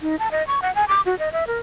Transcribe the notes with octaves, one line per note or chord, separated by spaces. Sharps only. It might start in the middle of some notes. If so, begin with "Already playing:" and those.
D#4
A5
D#5
C#6
F#5
G#5
D6
F#4
D#5
E5
A#4